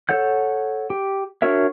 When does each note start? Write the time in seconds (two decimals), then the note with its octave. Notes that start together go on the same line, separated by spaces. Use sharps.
0.09 A4 C#5 F#5 G6
0.90 G4
1.42 D4 F#4 A#4 C#5 E5